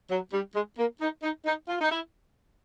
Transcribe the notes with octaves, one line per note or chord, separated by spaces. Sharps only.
F#3
G3
G#3
A#3
D#4
D#4
D#4
F4
D#4
E4